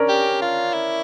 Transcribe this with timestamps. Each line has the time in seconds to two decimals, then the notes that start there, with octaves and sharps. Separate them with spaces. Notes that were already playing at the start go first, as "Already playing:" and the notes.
Already playing: C#4 D4 A#4
0.09 G4
0.42 F4
0.73 E4